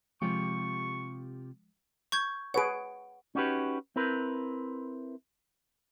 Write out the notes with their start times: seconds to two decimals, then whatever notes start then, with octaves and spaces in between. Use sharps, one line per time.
0.22 C3 F3 G#3 F4 G4 C#6
2.12 C#6 G6 G#6
2.54 G#4 B4 C#5 F#5 D7
3.35 C#4 D#4 F#4 G4 B4
3.96 C4 E4 A#4 B4